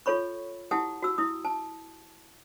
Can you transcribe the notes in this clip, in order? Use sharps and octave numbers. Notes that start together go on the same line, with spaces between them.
F4 A4 C#5 B5 C#6
E4 G4 F#5 A5 D#6
F#4 E6
E4 D#6
A5